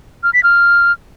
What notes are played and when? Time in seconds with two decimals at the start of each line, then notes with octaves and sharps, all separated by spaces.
0.23 F6
0.33 B6
0.43 F6